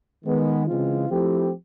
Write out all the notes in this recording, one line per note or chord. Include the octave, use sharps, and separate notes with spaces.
D#3 G#3 B3
C#3 E3 G#3 C4 F4
F3 A3 C4 E4 G4